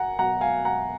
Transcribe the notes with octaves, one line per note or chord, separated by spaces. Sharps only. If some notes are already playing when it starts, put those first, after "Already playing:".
Already playing: F#5 G#5 A#5
B2 F#3 F#5 A#5
F5 G#5
F#5 A#5